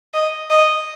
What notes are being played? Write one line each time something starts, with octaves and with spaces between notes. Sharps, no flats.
D#5
D#5